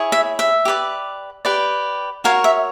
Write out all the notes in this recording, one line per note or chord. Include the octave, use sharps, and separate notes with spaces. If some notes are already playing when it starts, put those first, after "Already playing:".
Already playing: E4 G#4 C#5
E5
E5
G4 B4 D5
G4 B4 D5
F#4 A#4 C#5 F5
E5